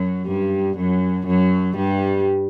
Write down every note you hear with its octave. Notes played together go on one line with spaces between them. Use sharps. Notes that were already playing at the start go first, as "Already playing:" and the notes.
Already playing: F#2 F#3
G2 G3
F#2 F#3
F#2 F#3
G2 G3